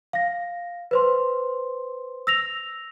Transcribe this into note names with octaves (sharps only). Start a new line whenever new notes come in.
F5 A#6
B4 C5 C6
E6 A#6 F7